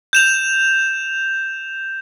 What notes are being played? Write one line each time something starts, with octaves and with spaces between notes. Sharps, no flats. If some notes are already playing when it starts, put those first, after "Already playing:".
G6 E7 F7